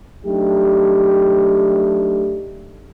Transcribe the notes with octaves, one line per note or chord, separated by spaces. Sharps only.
F#3 A3 D4 D#4 G4